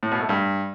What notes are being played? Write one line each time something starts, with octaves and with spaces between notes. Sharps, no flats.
A2
B2
A3
G2